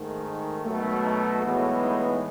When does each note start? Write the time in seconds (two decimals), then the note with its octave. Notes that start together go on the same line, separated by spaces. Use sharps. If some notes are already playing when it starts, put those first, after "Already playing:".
Already playing: G#2 D#3 A3
0.65 B2 F#3 A3
1.04 D#4
1.43 A2 E3 G#3 B3
1.81 D#4